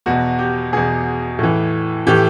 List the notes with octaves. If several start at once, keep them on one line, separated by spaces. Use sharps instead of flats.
E2 B2 F#4
G4
E2 B2 G#4
A2 E3
A2 E3 G4